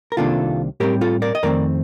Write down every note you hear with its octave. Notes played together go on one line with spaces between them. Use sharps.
A#4
C2 C3 D#3 A#3 D4 F4 A4
A2 G3 C4 G4 A#4
F4 A4
A#4 D5
D#5
F2 D#3 A3 C4 A#4 D5